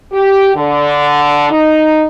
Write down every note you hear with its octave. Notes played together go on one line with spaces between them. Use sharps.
G4
D3
D#4